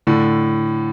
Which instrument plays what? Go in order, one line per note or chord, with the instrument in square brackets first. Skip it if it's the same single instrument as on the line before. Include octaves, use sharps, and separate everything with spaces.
[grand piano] A2 D3